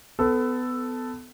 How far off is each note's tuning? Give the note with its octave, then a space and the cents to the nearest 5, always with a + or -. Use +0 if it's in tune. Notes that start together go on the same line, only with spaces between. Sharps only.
B3 +25 A4 +0